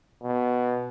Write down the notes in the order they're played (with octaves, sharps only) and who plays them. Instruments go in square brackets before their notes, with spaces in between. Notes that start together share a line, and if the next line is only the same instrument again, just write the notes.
[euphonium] B2